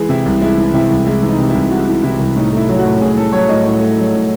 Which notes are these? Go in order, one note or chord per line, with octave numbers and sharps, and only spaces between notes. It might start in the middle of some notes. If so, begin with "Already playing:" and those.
Already playing: E3 G#3 G#4
C3 E4
C2
G#3 E4
E3
C3 E4
C2
G#3 E4
E3
D#4
C3
C2 E4
G#3 F#4
E3
C3 E4
C2
A2 D#4
A3 E4
F#3
F#4
A2
A2 G#4
A3 A4
F#3 C#5
A2 D#5
A2
A3
F#3
A2